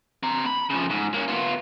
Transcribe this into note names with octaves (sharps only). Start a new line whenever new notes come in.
C4 A#5
B5
C#3 F3
G#2
A#3 C#4
B3 F4